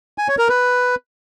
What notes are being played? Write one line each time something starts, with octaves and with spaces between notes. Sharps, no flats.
G#5
C#5
A#4
B4